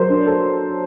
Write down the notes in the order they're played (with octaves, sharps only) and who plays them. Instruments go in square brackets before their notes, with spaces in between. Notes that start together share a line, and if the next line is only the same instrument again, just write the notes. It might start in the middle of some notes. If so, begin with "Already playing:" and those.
Already playing: [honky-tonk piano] F#3 [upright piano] A#4 C5
[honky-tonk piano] D4
A4